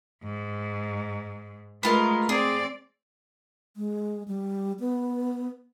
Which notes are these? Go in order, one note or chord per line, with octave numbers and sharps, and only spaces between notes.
G#2
G#3 A3 B3 F4 A#4
C4 G#4 D5
G#3
G3
B3